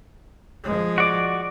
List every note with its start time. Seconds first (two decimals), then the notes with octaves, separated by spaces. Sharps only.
0.64 F3 G#3
0.98 F#4 D5 D6